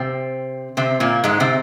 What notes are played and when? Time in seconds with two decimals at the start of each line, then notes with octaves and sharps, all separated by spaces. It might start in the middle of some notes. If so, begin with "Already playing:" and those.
Already playing: C3 C4
0.77 C3 C4
1.00 A#2 A#3
1.24 G#2 G#3
1.40 C3 C4